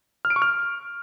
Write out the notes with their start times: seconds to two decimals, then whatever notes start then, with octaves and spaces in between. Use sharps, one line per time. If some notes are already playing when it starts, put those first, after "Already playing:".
0.25 F6
0.30 D7
0.36 C#6
0.42 F6